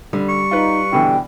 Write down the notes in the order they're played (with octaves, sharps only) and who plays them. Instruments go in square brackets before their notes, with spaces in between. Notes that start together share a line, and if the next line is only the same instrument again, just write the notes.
[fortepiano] D3 [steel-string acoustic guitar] G3
[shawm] C#6
[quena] D#4 [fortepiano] F4 B4
[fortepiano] B2 D3 E3 [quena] G5